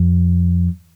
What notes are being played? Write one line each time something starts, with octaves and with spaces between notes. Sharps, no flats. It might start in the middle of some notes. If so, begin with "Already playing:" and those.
Already playing: F2